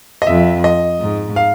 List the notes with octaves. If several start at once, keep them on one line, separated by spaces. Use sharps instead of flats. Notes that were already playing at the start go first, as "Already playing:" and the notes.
D#5
F2 E5
D#5
G#2
F5